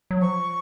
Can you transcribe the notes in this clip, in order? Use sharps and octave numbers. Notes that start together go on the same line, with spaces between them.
F#3
F3 C#6